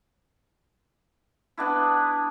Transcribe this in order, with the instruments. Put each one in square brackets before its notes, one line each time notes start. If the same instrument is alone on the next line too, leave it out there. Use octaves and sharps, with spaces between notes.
[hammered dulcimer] B3 D4 E4